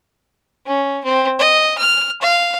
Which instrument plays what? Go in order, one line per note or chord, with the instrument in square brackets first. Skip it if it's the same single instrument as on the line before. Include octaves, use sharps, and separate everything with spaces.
[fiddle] C#4
C4
D#5
F6
F5